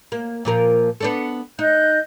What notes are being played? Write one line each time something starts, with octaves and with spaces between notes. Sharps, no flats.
A#3
A#2 F3 A#4
B3 D4 A4
D#4 D#5 F#6 G6